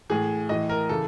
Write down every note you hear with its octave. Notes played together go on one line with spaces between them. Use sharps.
A2 E3 G#4
A2 E3 D#5
A#4
C#3 E3 A4